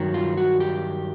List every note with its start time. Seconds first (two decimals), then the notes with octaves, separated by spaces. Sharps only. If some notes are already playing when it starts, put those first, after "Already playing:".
Already playing: G2 D#3 F#3
0.14 F4
0.37 F#4
0.60 G4